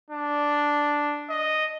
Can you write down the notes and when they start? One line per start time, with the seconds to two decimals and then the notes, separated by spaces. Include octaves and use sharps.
0.11 D4
1.30 D#5